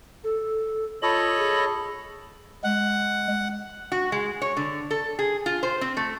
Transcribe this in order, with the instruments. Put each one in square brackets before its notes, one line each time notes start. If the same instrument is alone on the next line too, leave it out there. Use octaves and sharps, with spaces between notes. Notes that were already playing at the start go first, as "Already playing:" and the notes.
[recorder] A4
[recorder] F4 [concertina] A4 C#5 D#5 [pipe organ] B5
[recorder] G#4
[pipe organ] G#3 [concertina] F#5
[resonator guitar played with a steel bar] F#4
G#3
C#5
D3
A4
G#4
F4
C5
C4
A3